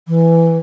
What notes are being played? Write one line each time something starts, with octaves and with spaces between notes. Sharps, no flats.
E3